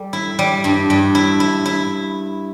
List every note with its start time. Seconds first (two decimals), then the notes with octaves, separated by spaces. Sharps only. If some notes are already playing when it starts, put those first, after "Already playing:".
Already playing: G3 A4
0.13 E4
0.39 G3
0.64 G2
0.90 G2
1.15 E4
1.40 E4
1.66 E4